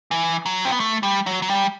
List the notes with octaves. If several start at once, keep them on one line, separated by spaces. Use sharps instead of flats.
E3
F#3
C4
B3
A3
G3
F#3
F#3
G3